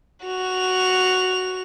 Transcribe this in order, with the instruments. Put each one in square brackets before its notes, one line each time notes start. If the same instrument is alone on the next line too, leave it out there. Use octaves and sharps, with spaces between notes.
[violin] F#4 F7